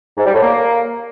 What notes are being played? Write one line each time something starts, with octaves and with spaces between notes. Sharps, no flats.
G#2
G3
A2
A#3